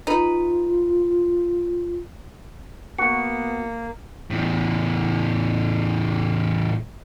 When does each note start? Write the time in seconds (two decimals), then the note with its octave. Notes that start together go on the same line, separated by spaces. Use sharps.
0.07 D#4 F4 B4
2.98 A#3 B3 F#4 C#7
4.31 E2 A2